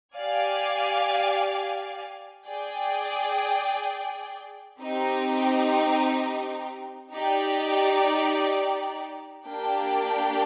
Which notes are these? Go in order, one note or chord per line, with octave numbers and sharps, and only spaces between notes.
G4 D5 F5 G#5
G#4 D5 G5
C4 D#4 G4
D#4 G4 D5
A#3 D4 G4 D5 G5